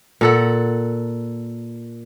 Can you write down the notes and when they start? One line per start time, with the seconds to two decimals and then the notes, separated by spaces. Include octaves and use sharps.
0.21 A#2 A4 F#5